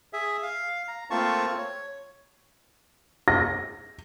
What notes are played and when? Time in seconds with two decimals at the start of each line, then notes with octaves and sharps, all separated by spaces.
0.13 G#4 E5
0.43 F5
0.88 A#5
1.10 A3 A#3 C4 F4 A5 C#6
1.58 C#5
3.28 A#6